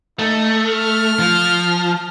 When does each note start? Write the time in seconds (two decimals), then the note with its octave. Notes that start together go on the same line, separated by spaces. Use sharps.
0.19 A3 D#4
0.68 F6
1.19 F3